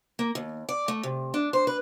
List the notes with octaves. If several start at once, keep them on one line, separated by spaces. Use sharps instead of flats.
A#3
D#2
D5
A3
C3
D4
C5
B4